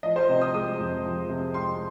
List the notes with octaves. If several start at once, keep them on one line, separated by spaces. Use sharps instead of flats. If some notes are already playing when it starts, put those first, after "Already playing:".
F3 D#5
C5
C3 D#5
D#6
G#3 D#6
F2
F3
C3
G#3 C6